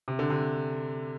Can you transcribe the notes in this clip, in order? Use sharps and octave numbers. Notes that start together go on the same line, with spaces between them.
C3
D3
C3